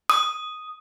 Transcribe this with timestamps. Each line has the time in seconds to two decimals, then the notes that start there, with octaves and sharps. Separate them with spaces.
0.10 D#6